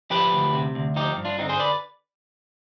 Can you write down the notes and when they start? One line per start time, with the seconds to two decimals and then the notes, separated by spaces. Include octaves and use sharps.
0.11 F3 G4 B4
0.33 D2
0.53 C3
0.75 D2
0.96 F3 D#4 G4
1.17 G2
1.25 D4 F4
1.38 D3 C4 D#4
1.49 G#4 C5
1.60 B4 D5